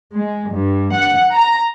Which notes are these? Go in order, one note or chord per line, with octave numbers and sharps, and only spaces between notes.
G#3
G2
F#5
A#5